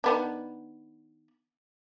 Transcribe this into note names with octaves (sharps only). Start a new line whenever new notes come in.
D#3 B3 D4